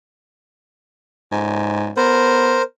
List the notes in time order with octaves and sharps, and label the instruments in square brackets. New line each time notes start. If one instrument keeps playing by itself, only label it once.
[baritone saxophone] G#2
[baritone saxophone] B3 [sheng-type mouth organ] A#4 C5